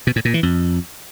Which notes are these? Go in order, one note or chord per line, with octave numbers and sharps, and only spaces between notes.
B2
A2
A#2
E3
F2